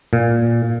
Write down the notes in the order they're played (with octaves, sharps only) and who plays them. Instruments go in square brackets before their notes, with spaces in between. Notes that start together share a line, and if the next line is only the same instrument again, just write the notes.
[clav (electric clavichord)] A#2